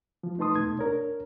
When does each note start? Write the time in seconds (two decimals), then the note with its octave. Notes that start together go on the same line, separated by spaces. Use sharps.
0.23 F3
0.38 A3 D#4 B4 A5 C6 D#6
0.56 B2 A3 D#4 G#6
0.79 D4 A#4 C#5